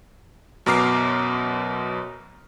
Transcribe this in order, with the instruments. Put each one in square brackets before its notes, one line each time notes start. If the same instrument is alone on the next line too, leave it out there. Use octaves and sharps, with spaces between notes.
[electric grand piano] F#2 B2 A#5 D6 F6 C7